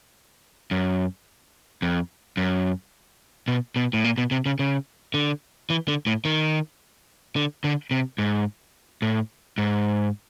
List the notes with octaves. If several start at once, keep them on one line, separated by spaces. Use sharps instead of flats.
F#2
F2
F#2
B2
B2
A2
A#2
B2
C3
C#3
C#3
D3
E3
D3
A2
D#3
D3
D3
C3
G#2
A2
G#2